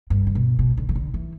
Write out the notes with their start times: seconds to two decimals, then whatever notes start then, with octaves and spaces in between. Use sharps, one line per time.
0.10 G2
0.27 D3
0.35 B2
0.59 B2
0.77 D3
0.89 E3
0.95 D3
1.14 E3